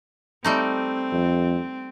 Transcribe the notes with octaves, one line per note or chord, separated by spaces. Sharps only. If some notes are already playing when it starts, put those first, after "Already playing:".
G3 A3 C4 D#4
F2